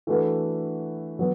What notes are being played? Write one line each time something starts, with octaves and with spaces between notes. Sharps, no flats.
E3 A3 D4 F#4 B4
F#3 B3